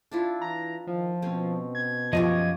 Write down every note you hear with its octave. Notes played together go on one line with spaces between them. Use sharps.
D4 E4 F4
E3 A#5
D#3 F3
B2 C4 C#4
G#6
F#2 F3 C#4 F4 G4 D#5